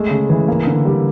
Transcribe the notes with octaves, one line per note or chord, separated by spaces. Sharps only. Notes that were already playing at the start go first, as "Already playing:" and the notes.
Already playing: G#3 A3
C#3
E3
A#3
D3
G3